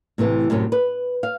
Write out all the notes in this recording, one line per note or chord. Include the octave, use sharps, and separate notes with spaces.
A2 C3 E3 A3
F#2 A2 C3 C#4
B4
F5